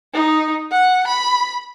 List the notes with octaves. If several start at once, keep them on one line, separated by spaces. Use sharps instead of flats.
D#4
F#5
B5